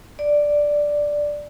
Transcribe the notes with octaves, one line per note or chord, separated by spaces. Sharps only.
D5